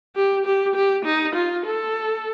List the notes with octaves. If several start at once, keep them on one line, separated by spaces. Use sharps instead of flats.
G4
G4
G4
D#4
F4
A4